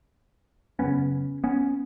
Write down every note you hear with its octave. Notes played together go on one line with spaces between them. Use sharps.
F#2 C#3 B3 C#4
B3 C#4